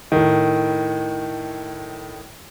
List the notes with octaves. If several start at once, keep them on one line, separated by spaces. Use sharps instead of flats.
A2 D#3